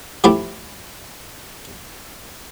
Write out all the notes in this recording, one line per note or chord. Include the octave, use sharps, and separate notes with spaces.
F3 A3 E4 G4 B5